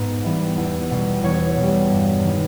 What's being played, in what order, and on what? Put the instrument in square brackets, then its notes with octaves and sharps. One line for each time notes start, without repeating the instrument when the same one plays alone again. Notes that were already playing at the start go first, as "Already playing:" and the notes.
Already playing: [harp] G#2 B3
E3 G3 B3
E2
B2 G3
E2 C#5
B2 G3
G2
D#3 G#3 B3